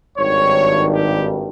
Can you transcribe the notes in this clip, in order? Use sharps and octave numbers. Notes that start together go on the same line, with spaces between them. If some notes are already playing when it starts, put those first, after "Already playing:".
G#1 G2 D#3 G3 C#5
G4